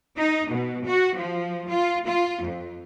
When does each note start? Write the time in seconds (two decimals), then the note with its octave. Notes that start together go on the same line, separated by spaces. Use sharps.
0.17 D#4
0.51 B2
0.86 F#4
1.16 F3
1.69 F4
2.06 F4
2.44 F2